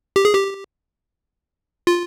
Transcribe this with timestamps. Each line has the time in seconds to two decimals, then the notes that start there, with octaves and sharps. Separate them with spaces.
0.16 G4
0.25 G#4
0.34 G4
1.87 F4